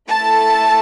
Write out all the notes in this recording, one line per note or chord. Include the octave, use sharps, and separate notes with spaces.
A3 E4 A4 A5